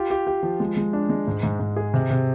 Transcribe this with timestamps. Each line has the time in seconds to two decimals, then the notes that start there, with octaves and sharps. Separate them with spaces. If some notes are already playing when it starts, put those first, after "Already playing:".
Already playing: F4 G4
0.10 G4
0.27 G4
0.43 F3
0.60 G#3
0.77 G#3
0.93 D4
1.10 G#3
1.27 G#2
1.43 G#2
1.60 G#2
1.76 G#4
1.94 C3
2.10 C3